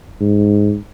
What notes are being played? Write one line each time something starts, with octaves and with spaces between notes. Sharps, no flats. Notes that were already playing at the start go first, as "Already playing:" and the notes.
G#2